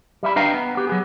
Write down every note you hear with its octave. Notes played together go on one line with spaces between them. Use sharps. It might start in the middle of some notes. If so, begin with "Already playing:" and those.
G3 E5 B5
D4 B4 D#5 F5 G5 A#5
B3
B3 G4
F#3 B3 G#4